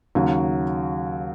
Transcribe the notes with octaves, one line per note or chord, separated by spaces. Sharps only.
D#2 C#3 F#3